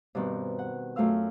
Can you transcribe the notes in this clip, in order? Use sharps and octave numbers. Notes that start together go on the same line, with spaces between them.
G2 B2 D#3 B3 C4
F#5
F#2 A3 F4 F5 E6